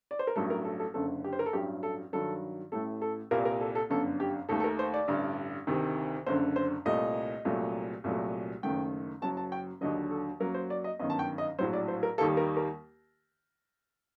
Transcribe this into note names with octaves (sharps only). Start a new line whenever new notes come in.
D5
C5
A#4
A1 G2 F#3 A3 A4
A#4
A4
A4
F#1 F#2 D3 A4
G4
C5
A#4
A4
A1 G2 F#3 G4
A4
G2 D#3 F#3 A4
A1 A2 A3 A4
A4
C2 A#2 G3 A#3 A#4
A#4
A4
A4
G1 F#2 D3 A4
G4
D#2 D#3 A3 A4
A4
A#4
C5
D5
A1 G2 D3
D2 C3 D#3
F#1 F#2 D3 C5
C5
C2 A#2 A3 D#5
C2 A#2 F#3 A3
C2 A#2 F#3 A3
F#1 F#2 D#3 A3 G5
F#1 F#2 F#3 A5
A5
G5
D#2 D3 F#3 D#5
A4
F#2 F#3 A#3 A#4
C5
D5
D#5
G1 F#2 D#3 D#5
A5
G5
D#5
A#1 A2 F#3 C5
D5
C5
A#4
D#2 D#3 G3 A#3 A4
A#4
A#4